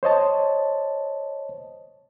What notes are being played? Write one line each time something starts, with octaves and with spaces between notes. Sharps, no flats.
C5 C#5 D#5 A5